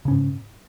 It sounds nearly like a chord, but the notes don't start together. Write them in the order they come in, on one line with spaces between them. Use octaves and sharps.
C#3 C#4 G#2